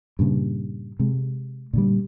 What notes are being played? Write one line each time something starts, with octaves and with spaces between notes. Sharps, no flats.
G2 A#2 C#3
C3 G#3
A#2 D3 G3